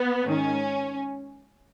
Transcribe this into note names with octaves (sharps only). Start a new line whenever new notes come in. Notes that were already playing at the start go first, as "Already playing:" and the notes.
Already playing: B3
G#2 D#3 C#4